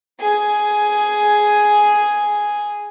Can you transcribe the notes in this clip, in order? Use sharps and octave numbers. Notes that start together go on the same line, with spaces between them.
G#4 G#5